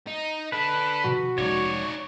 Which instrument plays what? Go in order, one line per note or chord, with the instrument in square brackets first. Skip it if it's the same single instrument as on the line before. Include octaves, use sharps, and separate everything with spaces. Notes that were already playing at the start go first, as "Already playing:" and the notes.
[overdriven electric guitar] D#4
[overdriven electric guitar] D4 A4 [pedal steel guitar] B4
[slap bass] C3 D#3 F3 [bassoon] F#4
[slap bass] F1 G#3 [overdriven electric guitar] D#4 D5 [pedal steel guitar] C#5